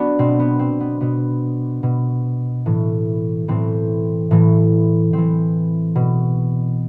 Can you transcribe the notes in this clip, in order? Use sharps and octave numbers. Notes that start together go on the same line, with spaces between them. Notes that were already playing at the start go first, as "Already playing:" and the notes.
Already playing: B3 D4 F#4
B2 C4
B3
C4
B3
B2 B3
B2
A2 E3
A2 E3 C4
A2 E3
A2 E3 C4
B2